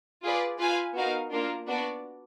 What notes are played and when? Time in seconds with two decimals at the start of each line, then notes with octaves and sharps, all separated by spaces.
0.23 F4 G#4 B4 D5
0.59 F4 B4 F5 G#5
0.95 B3 D#4 F#4 A#4 F5
1.31 A#3 D4 F4 A#4
1.68 B3 D4 F#4 D5